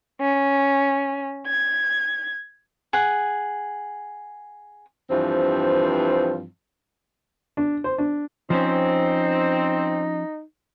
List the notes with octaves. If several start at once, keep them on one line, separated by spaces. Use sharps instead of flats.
C#4
G#6
G#4 F#5
G2 E3 F3 C4
D4
C5
D4
F3 C4 C#4 D#4